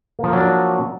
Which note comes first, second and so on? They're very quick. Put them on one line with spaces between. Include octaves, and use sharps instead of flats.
A#3 F3 A#4 F#3 D4